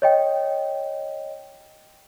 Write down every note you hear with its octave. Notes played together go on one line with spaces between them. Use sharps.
C#5 D#5 G5